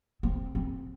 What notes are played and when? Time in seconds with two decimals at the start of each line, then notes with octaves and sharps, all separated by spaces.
0.23 C4
0.55 C4